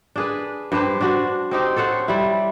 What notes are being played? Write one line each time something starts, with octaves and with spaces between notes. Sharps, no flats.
D4 G#4 B4
G2 G4 B4 C5
D4 F#4 C5
C4 D#4 G4 C5
A4 C5 C#5 F#5
G3 E4